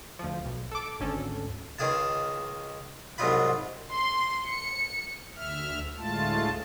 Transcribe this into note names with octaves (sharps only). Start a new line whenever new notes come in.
D2 F3
B1
A4 D6
G#1 D2 C#4 A4
C#2 D#3 G#4 F5 A5
C2 G#2 F#3 D#4 F4 B5
C6
C#7
D2 E5 F6
D2 A2 G#3 A3 F4 A5